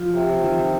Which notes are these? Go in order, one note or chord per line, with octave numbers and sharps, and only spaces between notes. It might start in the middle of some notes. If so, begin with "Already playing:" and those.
Already playing: F3
C3
D#3
D#3